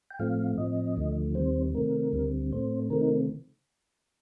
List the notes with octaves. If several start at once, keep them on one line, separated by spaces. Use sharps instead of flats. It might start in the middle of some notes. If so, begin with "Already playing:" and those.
G5
A2 F3 A3 C4 F5
A2 F3 C4 D#5
D2 D3 F3 A3
D#2 D#3 G3 C4 C5
C3 D#3 A3 C4 A#4
D2 D3 G3 C4
A2 A3 C4 C5
C3 D#3 A3 C4 A#4
D#4